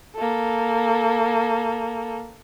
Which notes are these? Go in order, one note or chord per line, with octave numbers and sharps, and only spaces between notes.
A#3 A4